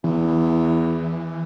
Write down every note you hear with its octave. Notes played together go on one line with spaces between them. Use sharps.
E2 E3